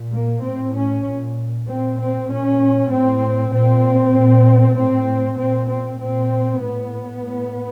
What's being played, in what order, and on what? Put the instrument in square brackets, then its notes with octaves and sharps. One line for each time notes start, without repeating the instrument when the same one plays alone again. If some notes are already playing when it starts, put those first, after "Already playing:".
Already playing: [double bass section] A#2
A#3
A2 C4
C#4
A#2
A#2 C4
C4
A#2 C#4
A2 C4
A#2 C4
A#2
A2 C4
A#2 C4
C4
A#2 C4
A2 B3
A2